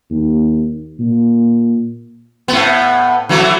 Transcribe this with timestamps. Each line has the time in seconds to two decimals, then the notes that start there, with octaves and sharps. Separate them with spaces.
0.10 D#2
0.99 A#2
2.48 A2 B3
3.29 E3 F#3 A3